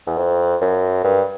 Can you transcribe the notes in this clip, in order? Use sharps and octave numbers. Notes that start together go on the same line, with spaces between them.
E2
F2
F#2
G2